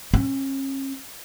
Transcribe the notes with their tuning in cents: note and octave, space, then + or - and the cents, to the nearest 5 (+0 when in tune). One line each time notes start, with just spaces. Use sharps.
C#4 -40